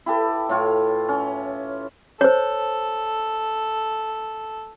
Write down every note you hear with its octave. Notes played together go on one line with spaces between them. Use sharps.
E4 G4 A4 B4
A2 F4 C#5
C#4
A4 C5 C#5